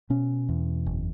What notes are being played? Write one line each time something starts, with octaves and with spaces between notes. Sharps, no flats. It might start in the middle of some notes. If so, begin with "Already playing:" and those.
B2 C#4
E2
F#1